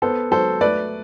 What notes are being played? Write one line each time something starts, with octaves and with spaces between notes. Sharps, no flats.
B3 A4 C5
F#3 A4 C5
A3 B4 D5